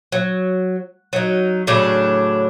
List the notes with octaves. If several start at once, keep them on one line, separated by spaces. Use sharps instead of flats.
F#3
F#3 D#4
A2 C#3 F#3 D4